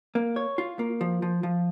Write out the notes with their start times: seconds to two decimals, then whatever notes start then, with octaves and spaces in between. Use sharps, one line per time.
0.15 A#3
0.36 C#5
0.58 F4
0.79 A#3
1.01 F3
1.22 F3
1.43 F3